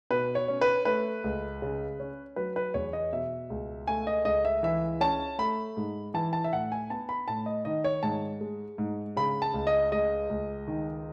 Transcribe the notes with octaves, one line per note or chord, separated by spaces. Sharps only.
B2 B4
C#5
C#4
B4
A3 B4
C#2
C#3
C#4
F#3 B4
B4
E2 C#5
D#5
B2 E5
C#2
A3 G#5
D#5
C#2 D#5
E5
E3 E5
C#4 A5
A3 B5
G#2
E3 A5
A5
E5
A2 F#5
G#5
B3 A5
B5
A2 A5
D#5
D#3 D#5
C#5
G#2 A5
G#3
G#2
C#3 B5
A5
C#2
D#5
G#3 D#5
C#2
D#3